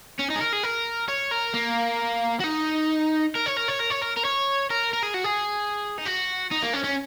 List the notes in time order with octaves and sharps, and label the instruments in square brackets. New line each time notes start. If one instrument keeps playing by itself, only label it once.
[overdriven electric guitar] C#4
D#4
G#4
A#4
G#4
A#4
C#5
A#4
A#3
F#4
D#4
A#4
C#5
A#4
C#5
A#4
C#5
A#4
A#4
C#5
A#4
A#4
G#4
F#4
G#4
D#4
F#4
D#4
A#3
C#4
C#4